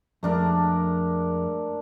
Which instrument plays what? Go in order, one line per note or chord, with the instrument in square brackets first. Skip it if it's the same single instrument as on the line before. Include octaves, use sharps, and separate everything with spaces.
[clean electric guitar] F2 G#3 [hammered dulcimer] A3 D4 A#4